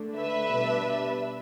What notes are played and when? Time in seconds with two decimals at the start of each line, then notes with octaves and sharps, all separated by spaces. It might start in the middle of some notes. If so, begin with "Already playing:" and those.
Already playing: D3 A3 D4
0.17 B4 E5
0.49 B2 G3 D4